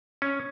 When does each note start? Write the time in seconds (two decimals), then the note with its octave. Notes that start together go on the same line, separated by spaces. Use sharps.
0.22 C#4